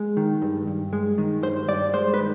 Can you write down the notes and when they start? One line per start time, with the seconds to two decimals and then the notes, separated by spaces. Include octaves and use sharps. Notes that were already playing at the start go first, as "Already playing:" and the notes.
Already playing: G#3
0.17 D#3
0.42 G2
0.67 G2
0.93 G#3
1.18 D#3
1.43 G2 C5
1.68 G2 D5
1.93 G#3 C5
2.14 B4
2.19 D#3